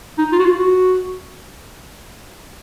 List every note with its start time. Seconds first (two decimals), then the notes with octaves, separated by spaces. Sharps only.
0.18 D#4
0.32 F4
0.39 F#4
0.45 F4
0.59 F#4